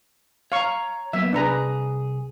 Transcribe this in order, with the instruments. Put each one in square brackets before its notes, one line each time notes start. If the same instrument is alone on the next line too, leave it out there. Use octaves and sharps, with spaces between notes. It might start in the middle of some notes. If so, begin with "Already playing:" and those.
[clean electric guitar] C#5 A#5 [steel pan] F5 C#6
[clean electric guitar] F#3 A#3 B3 [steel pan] E5
[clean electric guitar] C2 G#4 [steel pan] D4 B4 A#5